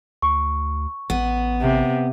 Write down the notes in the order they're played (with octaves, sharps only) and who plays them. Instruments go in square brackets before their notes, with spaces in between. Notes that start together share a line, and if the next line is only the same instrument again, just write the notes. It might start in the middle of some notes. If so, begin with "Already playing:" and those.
[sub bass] D2 [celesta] C#6
[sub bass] A1 [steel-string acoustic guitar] B3
[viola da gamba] C3